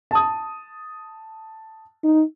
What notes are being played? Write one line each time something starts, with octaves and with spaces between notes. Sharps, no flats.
A5 D#6
D#4